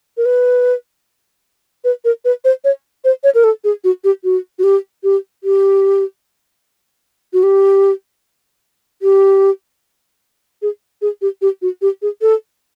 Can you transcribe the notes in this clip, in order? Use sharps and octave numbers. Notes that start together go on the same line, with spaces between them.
A#4
B4
B4
A#4
B4
C5
C#5
C5
C#5
A#4
A4
G#4
F#4
G4
F#4
F#4
G4
G4
G4
F#4
G4
G4
G#4
G#4
G4
G4
F#4
G4
G#4
A4